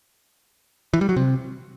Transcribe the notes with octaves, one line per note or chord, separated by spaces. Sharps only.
E3
G3
F#3
C3